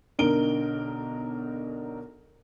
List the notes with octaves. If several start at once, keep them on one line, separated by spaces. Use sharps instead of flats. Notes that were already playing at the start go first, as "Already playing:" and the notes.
B1 D3 D#4 A#4 D7 G7